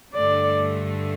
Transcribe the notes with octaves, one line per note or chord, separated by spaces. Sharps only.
G2 D3 A3 D5